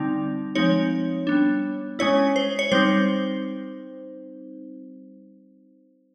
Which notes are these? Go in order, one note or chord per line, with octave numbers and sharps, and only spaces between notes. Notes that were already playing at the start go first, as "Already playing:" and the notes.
Already playing: D3 G3 C4 D#4
F3 G#3 C4 D#4 C#5
G3 B3 D4
G#3 C#4 E4 C#5
C5
C#5
G3 C4 D#4 C5